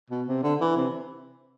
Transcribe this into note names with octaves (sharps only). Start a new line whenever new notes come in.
B2
C3
D3
E3
C3